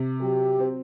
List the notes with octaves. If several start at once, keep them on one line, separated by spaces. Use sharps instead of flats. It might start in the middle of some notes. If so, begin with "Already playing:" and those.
Already playing: C3
F#3 G4
C4